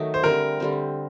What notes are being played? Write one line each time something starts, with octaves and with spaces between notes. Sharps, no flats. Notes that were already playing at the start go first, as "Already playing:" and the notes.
Already playing: D#3 F#3 A3 D#4
C5
D3 G3 C4 A#4
D3 G3 C4